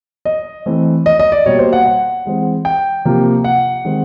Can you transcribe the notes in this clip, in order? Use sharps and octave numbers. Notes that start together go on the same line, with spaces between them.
D#5
E3 A3 C4
D#5
D#5
D5
B2 G3 A#3 C#5
C5
F#5
F#5
E3 G#3 C4
G5
C3 F3 A#3
F#5
D#3 G#3 C4